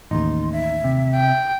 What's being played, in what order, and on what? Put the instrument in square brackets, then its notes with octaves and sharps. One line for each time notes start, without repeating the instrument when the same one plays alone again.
[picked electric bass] A1 D#2 [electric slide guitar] D#4 [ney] C6
[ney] E5
[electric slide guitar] C3
[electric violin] G5